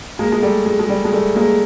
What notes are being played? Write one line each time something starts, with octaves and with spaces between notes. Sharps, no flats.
G#3 A#3
G#3
G3 A3
G#3
G#3
G3
G#3
G3 A3
G#3 A#3